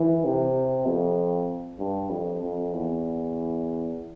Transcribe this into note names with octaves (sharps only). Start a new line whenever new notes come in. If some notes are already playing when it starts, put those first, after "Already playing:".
Already playing: E3
C3
F2
G2
F2
F2
E2